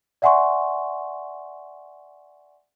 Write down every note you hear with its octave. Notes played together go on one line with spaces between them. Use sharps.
D5 E5 F#5 G#5 C6 C#6